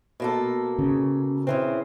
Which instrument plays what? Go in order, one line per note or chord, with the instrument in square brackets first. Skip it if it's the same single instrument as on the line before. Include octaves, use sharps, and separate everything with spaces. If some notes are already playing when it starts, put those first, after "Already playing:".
[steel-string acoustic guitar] B2 A#3 A4
[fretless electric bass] C#3
[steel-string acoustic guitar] C#3 E3 C4